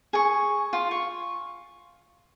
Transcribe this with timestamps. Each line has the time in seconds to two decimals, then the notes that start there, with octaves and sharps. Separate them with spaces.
0.13 G#4 C#6
0.73 F4
0.91 C#6